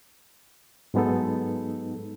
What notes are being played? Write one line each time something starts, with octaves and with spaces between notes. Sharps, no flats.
G#2 F#3 G#3 B3 D#4 A4